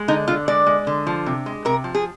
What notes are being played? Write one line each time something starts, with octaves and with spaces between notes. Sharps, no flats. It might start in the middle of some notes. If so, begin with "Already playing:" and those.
Already playing: G#3
D3 D#4
D3 F4
G#3 D5
G#3
D3
F3
C3
G#3
C3 A#4
F3
G#4